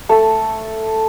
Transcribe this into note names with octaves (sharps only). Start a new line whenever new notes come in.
A3 A4